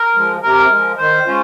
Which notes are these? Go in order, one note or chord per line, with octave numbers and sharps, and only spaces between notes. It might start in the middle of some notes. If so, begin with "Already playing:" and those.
Already playing: A#4
F3 G#3
C3 A#4
F3 G#3
D#3 C5
G#3 C#4 F4